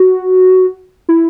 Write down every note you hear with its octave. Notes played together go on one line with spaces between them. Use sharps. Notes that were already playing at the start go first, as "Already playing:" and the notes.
Already playing: F#4
E4